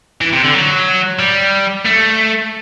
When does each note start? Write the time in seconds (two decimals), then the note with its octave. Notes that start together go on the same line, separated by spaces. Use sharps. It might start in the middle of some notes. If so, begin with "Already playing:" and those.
0.21 E3
0.32 C3
0.43 D3
0.54 F#3
1.19 G3
1.86 A3